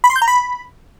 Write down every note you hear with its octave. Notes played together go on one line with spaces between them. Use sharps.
B5
C6
G6
A#5
B5